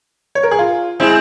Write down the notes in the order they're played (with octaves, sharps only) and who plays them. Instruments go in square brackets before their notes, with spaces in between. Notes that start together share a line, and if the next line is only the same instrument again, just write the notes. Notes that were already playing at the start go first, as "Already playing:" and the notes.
[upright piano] C#5
A#4
G#4
F4
[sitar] G#3 C4 [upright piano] E4